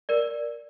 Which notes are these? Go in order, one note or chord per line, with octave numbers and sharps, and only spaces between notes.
A#4 D5